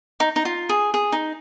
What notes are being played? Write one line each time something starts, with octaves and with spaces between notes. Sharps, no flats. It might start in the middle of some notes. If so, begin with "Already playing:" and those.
D#4
D#4
F4
G#4
G#4
D#4